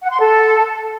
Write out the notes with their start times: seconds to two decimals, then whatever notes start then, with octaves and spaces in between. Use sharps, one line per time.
0.02 F#5
0.11 C6
0.20 A4